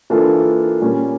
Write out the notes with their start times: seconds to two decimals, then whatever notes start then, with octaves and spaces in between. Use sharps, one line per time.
0.10 E3 A#3 D4 F4 A4
0.81 A#2 G3 A#3 C#4